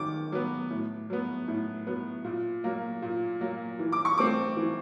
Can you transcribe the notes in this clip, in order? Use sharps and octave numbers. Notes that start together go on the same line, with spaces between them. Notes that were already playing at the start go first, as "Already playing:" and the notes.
Already playing: D#3 F#3 D6
F#3 B3
A2
F#3 B3
A2
F#3 B3
A#2
F#3 A#3
A#2
F#3 A#3
E3
D6
C#6
A3 C4 D6
E3